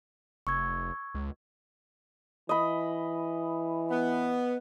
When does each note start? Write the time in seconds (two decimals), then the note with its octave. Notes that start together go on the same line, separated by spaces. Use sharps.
0.47 F1 C#6 E6 G#6
1.15 C#2
2.49 E3 D#5 B5
3.91 B3